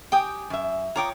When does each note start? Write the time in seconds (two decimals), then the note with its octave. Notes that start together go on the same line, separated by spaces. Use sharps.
0.12 G4 G5 G#5 D#6
0.50 F#2 E5
0.96 F4 C#5 G5 A#5 D6 D#6